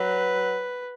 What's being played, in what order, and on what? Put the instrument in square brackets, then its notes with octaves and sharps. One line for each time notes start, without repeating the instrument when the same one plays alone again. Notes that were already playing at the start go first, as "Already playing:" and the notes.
Already playing: [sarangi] F#3 [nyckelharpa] B4